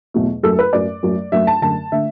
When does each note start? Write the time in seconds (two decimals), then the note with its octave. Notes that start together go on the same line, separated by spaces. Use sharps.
0.14 E2 B2 F#3 A3
0.43 F#2 F#3 A3 A4
0.59 B4
0.73 F#2 F#3 A3 D5
1.03 F#2 F#3 A3
1.32 F#2 F#3 A3 E5
1.47 A5
1.62 F#2 D3 A3 A5
1.92 D3 A3 E5